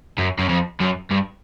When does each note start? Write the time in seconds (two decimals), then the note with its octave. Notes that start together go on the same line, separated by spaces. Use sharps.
0.18 F#2
0.39 F#2
0.49 F2
0.81 F#2
1.11 G2